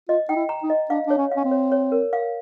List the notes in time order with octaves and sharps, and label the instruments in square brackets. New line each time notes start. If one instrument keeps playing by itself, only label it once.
[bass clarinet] F4 [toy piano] D#5
[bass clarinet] D#4 [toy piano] G5
[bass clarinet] E4
[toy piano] A#5
[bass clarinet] D#4
[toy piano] D#5
[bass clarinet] D4 [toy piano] F5
[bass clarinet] D4 [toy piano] C#5
[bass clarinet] C#4
[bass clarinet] C#4 [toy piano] F5
[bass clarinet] C4
[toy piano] C#5
C#5
A#4
F5